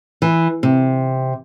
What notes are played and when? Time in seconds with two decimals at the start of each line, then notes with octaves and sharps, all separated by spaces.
0.22 E3
0.63 C3